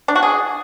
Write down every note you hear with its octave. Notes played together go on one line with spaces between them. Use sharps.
D4
F#4
G#4